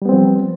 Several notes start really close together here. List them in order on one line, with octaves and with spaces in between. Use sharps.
G3 B3 C4 F3